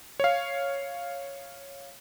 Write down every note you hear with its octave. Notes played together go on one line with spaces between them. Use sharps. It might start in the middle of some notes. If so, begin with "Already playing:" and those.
C#5 F5